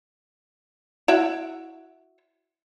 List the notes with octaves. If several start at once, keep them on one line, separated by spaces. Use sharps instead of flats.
E4 F#4 E5